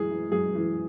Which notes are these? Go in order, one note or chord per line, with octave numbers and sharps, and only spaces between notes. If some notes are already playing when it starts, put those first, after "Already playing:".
Already playing: F#2 E3 G#3 G#4
E3
F#2 G#4
E3